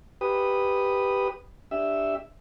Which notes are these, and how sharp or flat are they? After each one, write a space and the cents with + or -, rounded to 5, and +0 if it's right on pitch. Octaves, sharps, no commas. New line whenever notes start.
G4 +0 B4 +0 D#6 -10
D4 +0 G4 +10 E5 +0